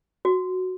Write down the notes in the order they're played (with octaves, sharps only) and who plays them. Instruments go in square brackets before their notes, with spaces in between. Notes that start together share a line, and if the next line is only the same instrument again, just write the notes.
[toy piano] F#4